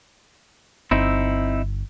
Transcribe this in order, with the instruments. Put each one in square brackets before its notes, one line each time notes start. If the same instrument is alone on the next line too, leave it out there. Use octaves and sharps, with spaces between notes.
[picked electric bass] G1 [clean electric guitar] C4 D#4 E4